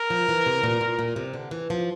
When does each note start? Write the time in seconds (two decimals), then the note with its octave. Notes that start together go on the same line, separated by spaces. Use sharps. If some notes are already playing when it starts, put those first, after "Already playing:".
Already playing: A#4
0.10 F3
0.29 E3
0.46 C3
0.63 A#2
0.81 A#2
0.99 A#2
1.16 C3
1.34 D3
1.51 E3
1.70 F3